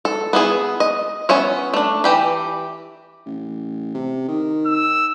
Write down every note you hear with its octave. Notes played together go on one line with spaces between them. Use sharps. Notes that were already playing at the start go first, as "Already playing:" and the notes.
A4
B3 E4 G#4
D#5
B3 C#4 C#5 E5
A3 D4
E3 G4 B5
A1
C3
D#3
E6